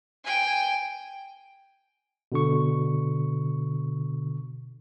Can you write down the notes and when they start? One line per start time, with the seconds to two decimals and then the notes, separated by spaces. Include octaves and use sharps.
0.24 G5 G#5
2.32 B2 D3 C#6